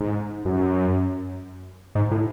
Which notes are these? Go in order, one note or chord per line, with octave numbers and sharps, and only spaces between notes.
G#2
F#2
G#2
A2